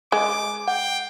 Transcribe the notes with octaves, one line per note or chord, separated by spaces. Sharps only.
G#3 D6
F#5 G5